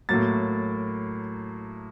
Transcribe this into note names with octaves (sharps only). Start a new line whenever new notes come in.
A2 F#3 A#3 A6